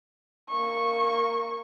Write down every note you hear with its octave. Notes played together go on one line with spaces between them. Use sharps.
A#3 C#6